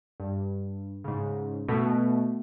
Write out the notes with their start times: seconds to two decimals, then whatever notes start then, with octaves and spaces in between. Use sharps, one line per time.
0.20 G2
1.04 G#2 C#3
1.68 B2 A3